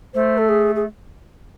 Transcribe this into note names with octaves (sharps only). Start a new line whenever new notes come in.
A3 C5
A4
G#4
G#4